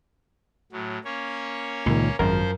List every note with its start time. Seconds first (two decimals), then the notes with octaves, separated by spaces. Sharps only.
0.72 A2 F#3
1.04 A#3 C#4 C#5
1.86 C#2 A#2 D#3
2.19 G#1 F#2 F3 A#4 C5